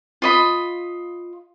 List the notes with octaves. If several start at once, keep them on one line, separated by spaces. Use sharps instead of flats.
F4 D#5 B5